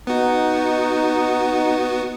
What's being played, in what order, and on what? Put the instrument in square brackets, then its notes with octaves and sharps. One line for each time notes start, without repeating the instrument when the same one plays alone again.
[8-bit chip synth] B3 F#4 [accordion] D#4